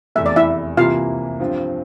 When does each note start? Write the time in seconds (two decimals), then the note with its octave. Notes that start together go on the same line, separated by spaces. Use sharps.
0.15 F1 E2 E3 A3 E5
0.26 D5
0.36 E4 E5
0.77 C2 C3 E3 A#3 E4 F4 F5
1.40 G2 F3 C4 F4